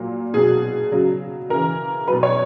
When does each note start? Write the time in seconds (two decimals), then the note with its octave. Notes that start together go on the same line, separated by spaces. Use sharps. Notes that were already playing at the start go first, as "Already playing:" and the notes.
Already playing: A#2 F#3
0.34 B2 F#3 G#4
0.91 C#3 F#3
1.49 C#3 E3 A#4
2.08 B2 F#3 B4
2.23 C#5